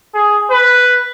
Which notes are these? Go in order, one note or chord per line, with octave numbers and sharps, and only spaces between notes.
G#4
B4